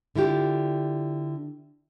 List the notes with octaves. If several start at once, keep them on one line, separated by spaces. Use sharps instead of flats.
D3 E4 F4 G4